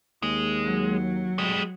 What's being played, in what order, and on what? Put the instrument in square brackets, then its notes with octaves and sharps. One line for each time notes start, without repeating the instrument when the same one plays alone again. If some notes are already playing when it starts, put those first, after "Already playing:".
[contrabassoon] D#2 [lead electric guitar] G#3
[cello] F#3
[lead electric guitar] G3 G#3